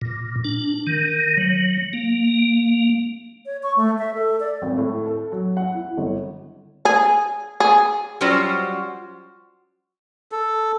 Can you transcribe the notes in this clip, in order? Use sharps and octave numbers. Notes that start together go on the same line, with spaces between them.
A#2
D4
D#3
F#3
A#3
C#5
C#6
A3
E5
A4
D5
G#1
A2
A4
F#3
F#5
E4
G1
G#4
G#4
F#3 G3 C#4 F4 F#4 C5
A4